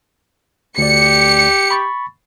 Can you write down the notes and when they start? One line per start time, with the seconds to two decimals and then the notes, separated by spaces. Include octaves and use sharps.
0.78 D2 G4 D5 C#7
1.71 B5 C#6 A6